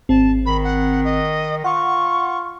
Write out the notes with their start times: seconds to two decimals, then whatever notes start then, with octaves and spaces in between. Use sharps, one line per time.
0.09 G#1 C4 A5
0.46 D#3 B5
0.64 F#5
1.04 D#5
1.64 F4 F#5 C#6